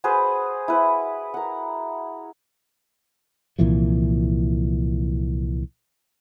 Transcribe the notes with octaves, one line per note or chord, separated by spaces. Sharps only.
F#4 G#4 B4 C5
E4 B4
A#4 F#5
C2 A#2 E3 F3